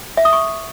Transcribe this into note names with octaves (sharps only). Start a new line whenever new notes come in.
E5
D#6
C#6